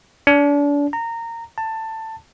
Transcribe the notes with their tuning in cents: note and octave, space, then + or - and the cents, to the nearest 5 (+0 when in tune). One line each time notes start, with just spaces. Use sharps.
D4 -35
A#5 -20
A5 +15